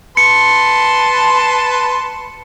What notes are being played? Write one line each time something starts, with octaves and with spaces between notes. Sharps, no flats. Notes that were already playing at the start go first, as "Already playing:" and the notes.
B4 A5 C6 C#7